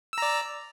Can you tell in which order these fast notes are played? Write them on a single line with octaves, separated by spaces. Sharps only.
E6 A#5 D5